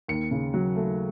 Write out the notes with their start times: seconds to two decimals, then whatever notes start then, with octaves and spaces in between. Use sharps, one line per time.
0.08 D#2 C#7
0.31 C#3
0.54 F#3
0.76 A3